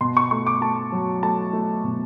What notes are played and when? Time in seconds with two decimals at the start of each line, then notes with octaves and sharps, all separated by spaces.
0.01 B2 C6
0.17 C#6
0.31 A3 C#6
0.47 D6
0.61 A3 A5
0.92 F#3
1.23 A3 A5
1.53 A3
1.84 B2